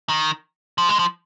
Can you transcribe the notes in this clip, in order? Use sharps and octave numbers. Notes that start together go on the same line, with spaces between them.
D#3
F3
G#3
F3